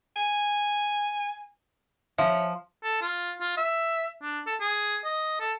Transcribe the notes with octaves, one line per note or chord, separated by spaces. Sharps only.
G#5
F3 C#4 E5
A4
F4
F4
E5
D4
A4
G#4
D#5
A4